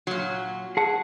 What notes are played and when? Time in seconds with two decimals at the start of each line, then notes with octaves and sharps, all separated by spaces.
0.07 A#2 F#3
0.77 G#4 F#5 A5